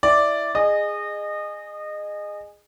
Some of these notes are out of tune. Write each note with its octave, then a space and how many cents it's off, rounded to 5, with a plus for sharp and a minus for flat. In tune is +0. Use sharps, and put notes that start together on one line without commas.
E4 +0 D5 +0
G#4 -5 D#5 -25